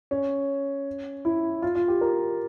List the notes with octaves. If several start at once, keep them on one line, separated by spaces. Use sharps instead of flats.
C#4
E4
F4
F4
G4
A#4